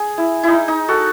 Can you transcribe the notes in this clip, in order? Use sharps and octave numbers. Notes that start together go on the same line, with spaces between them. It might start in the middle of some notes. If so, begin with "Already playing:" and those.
Already playing: G#4
E4
D#4 E4
D#4
F#4 A4